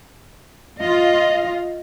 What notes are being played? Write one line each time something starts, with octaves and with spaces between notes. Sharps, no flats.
F4 D#5 F5